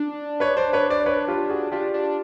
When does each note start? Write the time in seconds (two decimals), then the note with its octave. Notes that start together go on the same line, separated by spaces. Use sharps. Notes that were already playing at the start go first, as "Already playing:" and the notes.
Already playing: D4
0.40 B4 C#5
0.57 C5 D5
0.73 B4 C#5
0.90 C5 D5
1.06 B4 C#5
1.28 F4 G4
1.50 F#4 G#4
1.72 D4 F4 G4
1.94 D4